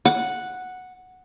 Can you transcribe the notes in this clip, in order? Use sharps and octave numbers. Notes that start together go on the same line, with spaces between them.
F#5